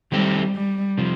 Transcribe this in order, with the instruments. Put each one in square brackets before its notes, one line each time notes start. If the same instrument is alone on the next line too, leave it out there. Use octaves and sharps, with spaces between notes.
[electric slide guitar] D#3 A3 C4 G4 [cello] G3
[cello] G3
[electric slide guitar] C3 F3